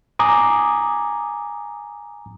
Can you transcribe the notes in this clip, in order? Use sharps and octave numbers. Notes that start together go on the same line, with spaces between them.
G#5 A#5 D6 D#6